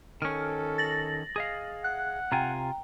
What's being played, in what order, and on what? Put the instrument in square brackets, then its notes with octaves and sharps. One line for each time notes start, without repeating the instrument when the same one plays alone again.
[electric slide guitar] D#3 C#4 [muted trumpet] A4 [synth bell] F6
[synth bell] A6 A#6 F#7
[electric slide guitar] G#4 D#5 F5
[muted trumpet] F#5 [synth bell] F#6
[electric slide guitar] C3 F4 G#5 [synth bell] G5 A#5